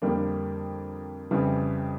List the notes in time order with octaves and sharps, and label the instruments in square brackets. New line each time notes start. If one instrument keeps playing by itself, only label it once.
[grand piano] F2 D3 G3 A#3 D4
F2 C#3 E3 G3